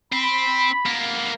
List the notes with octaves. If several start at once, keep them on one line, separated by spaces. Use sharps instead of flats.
C4 B5
A#3 B3